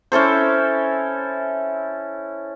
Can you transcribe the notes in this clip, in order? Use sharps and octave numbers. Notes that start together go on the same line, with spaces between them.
C#4 E4 A4 C5